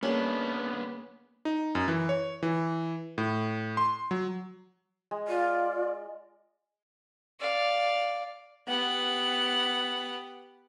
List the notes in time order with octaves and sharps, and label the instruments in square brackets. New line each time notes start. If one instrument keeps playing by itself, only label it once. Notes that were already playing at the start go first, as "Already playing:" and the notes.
[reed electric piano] A#3 [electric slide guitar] B3 D4 [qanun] C#4 G#4
[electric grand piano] D#4
F#2
E3
C#5
E3
A2
C6
F#3
[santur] G#3
[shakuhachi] F4 [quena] D5
[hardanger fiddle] D5 F5
[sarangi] B3 [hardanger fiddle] G4 F#5